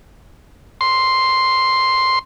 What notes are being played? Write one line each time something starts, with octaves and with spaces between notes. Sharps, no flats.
C6